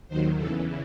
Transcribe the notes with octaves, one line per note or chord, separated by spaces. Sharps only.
D#2 D#3 F#3 C5
E2 C#3 E3 A4